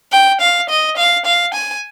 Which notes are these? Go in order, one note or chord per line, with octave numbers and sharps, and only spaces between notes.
G5
F5
D#5
F5
F5
G#5